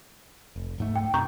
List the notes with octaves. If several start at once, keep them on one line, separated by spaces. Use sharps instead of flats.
F1
D1 G#2 A3
G5
F#2 B2 C4 A#5 C#6 G6